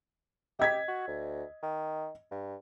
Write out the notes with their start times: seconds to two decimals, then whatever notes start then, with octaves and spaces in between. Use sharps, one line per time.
0.59 G4 D#5 G#6 B6
0.88 F#4
1.08 D2
1.63 D#3
2.31 G2